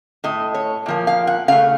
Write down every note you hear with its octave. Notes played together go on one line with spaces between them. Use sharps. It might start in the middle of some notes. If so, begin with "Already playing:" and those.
A2 A3 D#5
C#5
A#2 F3 A#3
F5
F#5
C#3 A3 F5